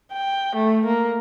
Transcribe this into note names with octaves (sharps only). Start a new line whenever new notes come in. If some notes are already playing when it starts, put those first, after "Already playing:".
G5
A3
A#3